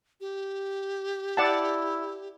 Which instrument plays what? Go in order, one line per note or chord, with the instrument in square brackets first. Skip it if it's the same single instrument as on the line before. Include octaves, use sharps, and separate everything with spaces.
[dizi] G4
[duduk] E4 [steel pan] D5 F#5 A5